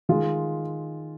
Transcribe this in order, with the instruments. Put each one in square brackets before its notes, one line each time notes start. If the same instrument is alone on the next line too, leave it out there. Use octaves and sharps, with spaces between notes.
[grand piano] D#3 G#3 F4